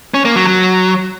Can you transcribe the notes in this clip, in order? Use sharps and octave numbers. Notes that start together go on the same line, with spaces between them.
C#4
A#3
F#3
F#3